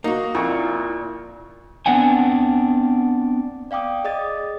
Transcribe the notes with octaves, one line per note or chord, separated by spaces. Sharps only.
A#3 D#4 F#4
F2 A#2 E4 C#6
B3 C4 D4 F#5 G#5
D5 F5 G5 D6 D#6
G#4 D5 D#5 D#6 A6